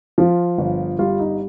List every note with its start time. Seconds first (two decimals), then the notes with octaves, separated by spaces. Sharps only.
0.18 F3 F4
0.58 G1
0.99 G3 F4
1.19 D#4